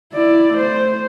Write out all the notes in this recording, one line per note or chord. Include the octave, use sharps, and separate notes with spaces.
E4 D5
A3 C5